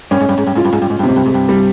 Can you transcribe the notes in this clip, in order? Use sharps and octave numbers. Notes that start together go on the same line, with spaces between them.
G2 C#4
G#2
G2
G#2
G2
G#2 F4
G2
G#2
G2
G#2
G2
C3
G#2
G2
G#2
G2
G3